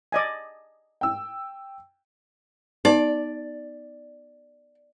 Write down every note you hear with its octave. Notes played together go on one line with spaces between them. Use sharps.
D5 D#5 G#5
G5 E6
B3 D#4 D5 A5